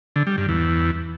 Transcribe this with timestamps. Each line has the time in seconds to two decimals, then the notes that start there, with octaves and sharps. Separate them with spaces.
0.16 D3
0.27 G3
0.38 G2
0.49 E2